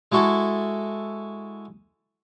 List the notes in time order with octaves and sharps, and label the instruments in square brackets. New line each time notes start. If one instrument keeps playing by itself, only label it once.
[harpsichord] G#3 E4 F#4 A4